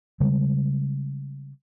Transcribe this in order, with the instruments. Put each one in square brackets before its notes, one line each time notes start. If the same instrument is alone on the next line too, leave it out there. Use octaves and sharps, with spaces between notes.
[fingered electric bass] C#3 G3 G#3